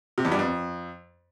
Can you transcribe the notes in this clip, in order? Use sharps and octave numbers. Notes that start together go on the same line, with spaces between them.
C3
E2
G2
F2